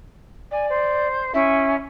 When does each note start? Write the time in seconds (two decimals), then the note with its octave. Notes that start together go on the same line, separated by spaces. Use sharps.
0.51 D5 G#5
0.69 C5
1.34 C#4 E4 E5